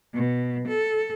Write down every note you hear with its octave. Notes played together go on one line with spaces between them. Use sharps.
B2
A4